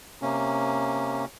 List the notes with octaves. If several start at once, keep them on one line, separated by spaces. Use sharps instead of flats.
C3 A#3 C#4